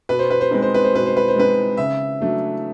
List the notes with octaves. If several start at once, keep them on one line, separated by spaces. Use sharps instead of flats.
B2 B4
C5
B4
C5
G#3 C4 D#4 B4
C5
B4
C5
B2 B4
C5
B4
C5
G#3 C4 D#4 B4
C#3 E5
F#3 A3 D4